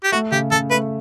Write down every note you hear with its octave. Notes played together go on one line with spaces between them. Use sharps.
G4
A3 F#4
C#3 G4
C#3 A4
A3 B4